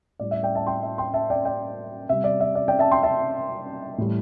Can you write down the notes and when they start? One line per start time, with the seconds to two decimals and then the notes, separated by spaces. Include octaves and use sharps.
0.19 A2 G3 D5
0.31 E5
0.43 D5 G5
0.55 E5 A5
0.67 G5 C6
0.83 E5 A5
0.98 G5 C6
1.14 E5 A5
1.30 D5 G5
1.45 D5 G5
2.09 C3 G3 E5
2.24 D5
2.40 E5
2.55 D5
2.68 D5 G5
2.79 E5 A5
2.92 G5 C6
3.03 E5 A5
3.98 A2 E3 G3